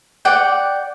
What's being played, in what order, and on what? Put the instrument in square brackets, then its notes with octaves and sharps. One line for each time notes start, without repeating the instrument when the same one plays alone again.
[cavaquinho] D5 F#5 G5